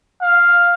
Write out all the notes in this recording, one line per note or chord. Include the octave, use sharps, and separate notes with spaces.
F5